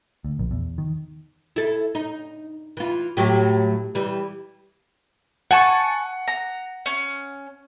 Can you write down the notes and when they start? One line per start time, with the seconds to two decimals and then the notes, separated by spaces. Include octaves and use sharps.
0.24 D2
0.39 A#1
0.51 E2
0.78 D#3
1.56 E4 A4
1.95 D#4
2.77 E3 F4
3.17 A2 F#3 G4
3.95 E3 G3
5.51 F#5 G#5 A5 C#6
6.28 A#5
6.86 C#4